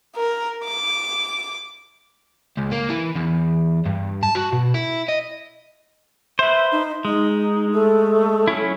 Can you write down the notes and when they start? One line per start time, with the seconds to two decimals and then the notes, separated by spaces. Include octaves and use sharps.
0.16 A#4
0.64 D6
2.58 C#2
2.72 A#3
2.90 E3
3.16 E2
3.86 G2
4.23 A5
4.35 F#4
4.52 B2
4.74 E4
5.08 D#5
6.39 B4 C5 E5
6.72 D#4
7.05 G#3 D#4
7.72 A3
8.48 F#3 C#4 E4